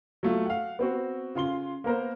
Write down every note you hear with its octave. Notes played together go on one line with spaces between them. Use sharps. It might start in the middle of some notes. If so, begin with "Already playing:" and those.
F#3 A3 F4
F5 F#5
B3 C4 F#4
C#3 F4 C6 G7
A#3 B3 A#4 C5